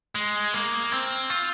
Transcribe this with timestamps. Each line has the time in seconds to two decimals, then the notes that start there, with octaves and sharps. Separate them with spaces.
0.15 G#3
0.54 A#3
0.92 C4
1.30 F4